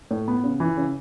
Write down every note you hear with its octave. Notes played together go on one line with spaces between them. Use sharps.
A2
B3
C#3
E3
C#3